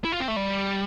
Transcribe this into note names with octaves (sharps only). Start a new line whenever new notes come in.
E4
F4
C4
A3
G3